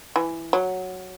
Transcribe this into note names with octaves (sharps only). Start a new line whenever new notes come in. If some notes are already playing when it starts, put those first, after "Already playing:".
E3
F#3